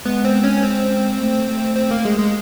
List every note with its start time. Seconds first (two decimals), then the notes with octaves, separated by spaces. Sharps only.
0.05 G#3 B3
0.25 C4
0.44 C#4
0.63 C4
1.19 A3
1.48 A3
1.76 C4
1.91 A#3
2.05 G#3
2.19 G#3